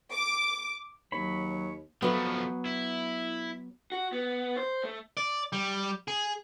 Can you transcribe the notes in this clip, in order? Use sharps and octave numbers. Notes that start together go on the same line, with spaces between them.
D6
D#2 F#3 C#5 B5
F3 F#3 A3 B3
E4
F#4
B3
C5
A3
D5
G3
G#4